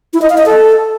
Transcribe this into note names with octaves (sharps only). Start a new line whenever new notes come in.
E4
D#5
F5
D#5
A4